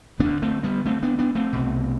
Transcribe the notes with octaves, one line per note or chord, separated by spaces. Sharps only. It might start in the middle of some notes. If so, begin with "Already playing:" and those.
D2 D3 B3 D4
A3 C4
G3 B3
A3 C4
B3 D4
B3 D4
A3 C4
C2 B2